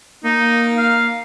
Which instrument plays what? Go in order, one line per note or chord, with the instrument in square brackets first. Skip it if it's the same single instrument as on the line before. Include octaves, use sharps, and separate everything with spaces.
[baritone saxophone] A#3 [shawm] D#4
[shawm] F5